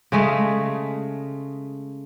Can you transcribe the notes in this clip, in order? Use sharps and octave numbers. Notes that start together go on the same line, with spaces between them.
C#3 G#3 A3